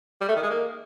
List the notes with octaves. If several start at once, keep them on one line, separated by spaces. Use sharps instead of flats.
G3
A3
D#3
G#3
A#3